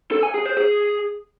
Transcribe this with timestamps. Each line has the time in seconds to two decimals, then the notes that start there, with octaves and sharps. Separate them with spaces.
0.11 A4
0.23 G#5
0.34 G#4
0.45 C5
0.57 G#4